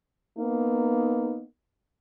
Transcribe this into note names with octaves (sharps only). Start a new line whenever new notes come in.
A#3 B3 D#4